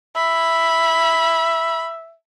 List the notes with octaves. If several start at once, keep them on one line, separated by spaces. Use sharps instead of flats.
E5 B5